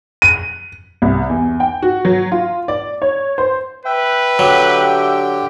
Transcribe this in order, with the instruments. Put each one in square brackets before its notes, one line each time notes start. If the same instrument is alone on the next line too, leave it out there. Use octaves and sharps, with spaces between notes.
[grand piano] D#7
[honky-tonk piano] C2
E2
G5
F#4
F#3
F4
D5
C#5
C5
[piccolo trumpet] B4 [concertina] E5 G5
[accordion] D3 G4 [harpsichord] F#3